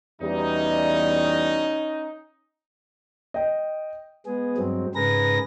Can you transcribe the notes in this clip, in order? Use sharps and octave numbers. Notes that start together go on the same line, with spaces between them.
E2 B2 G3 C#4 D#4
D#5 G5
G#3 B3 G#4
G2 F#3 G#3 C4
G#2 C#3 G#4 A#4 B4 A#6